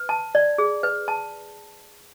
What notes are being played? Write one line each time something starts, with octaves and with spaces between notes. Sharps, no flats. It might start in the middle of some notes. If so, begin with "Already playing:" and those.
Already playing: B4
A5
D5
G#4
B4
A5